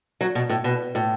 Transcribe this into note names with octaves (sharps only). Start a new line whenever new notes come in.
F#3
B2
A2
B2
A2